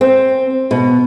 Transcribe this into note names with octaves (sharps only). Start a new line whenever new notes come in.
C4
B2